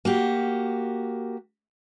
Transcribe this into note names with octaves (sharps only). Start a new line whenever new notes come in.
A#3 F#4 G4